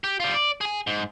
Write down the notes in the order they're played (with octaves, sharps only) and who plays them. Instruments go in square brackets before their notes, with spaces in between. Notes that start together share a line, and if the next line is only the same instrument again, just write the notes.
[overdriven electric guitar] G4
G3 F4
D5
G#4 G#5
G#2